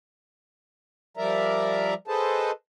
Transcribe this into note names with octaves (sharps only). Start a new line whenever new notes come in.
F3 G3 A#4 D5 E5 A#5
G#4 A4 B4 C5 D#5 A5